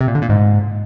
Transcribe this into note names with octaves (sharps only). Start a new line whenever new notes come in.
C3
A#2
D3
A#2
G#2